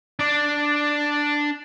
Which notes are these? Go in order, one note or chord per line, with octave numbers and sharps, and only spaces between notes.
D4 D5